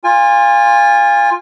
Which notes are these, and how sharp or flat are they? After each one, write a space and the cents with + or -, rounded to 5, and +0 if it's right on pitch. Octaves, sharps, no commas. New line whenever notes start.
F4 +0 G#5 -30